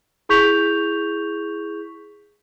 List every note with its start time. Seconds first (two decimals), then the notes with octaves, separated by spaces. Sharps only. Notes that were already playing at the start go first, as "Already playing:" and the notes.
0.29 E4 G#4 C#6 G6 B6 F7